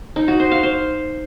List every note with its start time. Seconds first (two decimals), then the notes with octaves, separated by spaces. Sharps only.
0.16 D#4
0.28 F#4
0.40 C5
0.51 F5
0.63 C5